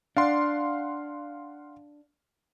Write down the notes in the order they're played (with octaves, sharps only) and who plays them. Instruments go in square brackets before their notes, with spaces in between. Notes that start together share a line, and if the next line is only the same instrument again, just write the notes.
[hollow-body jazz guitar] D4 [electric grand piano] F5 F#5 C6